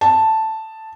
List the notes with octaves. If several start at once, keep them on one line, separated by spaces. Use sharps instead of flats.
A5